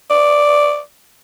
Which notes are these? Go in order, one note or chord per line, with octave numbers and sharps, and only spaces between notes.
D5